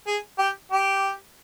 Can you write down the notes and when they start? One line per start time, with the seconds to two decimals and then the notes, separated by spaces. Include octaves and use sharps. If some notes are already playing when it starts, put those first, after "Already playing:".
0.07 G#4
0.39 G4
0.72 G4